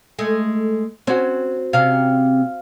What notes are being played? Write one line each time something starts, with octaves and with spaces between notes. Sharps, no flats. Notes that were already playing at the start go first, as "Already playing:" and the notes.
G#3 A3
C4 C#4 F#4
C3 C#4 F5